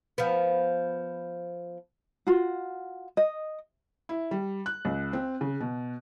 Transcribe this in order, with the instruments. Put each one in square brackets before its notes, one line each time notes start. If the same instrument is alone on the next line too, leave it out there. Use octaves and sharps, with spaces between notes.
[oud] F3 B3
[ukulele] F4 F#4
D#5
[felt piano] E4
G3
F#6
C#2
C4
C#3
B2